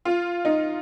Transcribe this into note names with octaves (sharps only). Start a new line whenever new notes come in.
F4
D#4